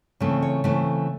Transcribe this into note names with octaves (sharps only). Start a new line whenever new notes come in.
C#3 E3 A3 C4
C#5
C#3 E3 A3 C4